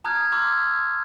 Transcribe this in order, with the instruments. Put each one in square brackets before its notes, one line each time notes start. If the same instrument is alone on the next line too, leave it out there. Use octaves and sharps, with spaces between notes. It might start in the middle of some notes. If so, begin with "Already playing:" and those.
[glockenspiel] A5 A#5 D#6 F6 F#6 G#6
A#5 C6 D6 E6 F6 G#6